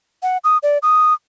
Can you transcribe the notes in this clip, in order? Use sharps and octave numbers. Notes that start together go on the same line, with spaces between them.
F#5
D#6
D5
D#6